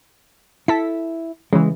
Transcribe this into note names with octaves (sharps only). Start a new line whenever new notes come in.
E4 A4 B6
C#3 E3 G#3